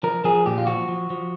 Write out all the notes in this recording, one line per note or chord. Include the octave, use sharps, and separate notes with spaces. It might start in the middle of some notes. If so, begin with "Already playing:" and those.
F3 A#4
F3 G#4
A#2 G4
F4
F3 F#4
F3
F3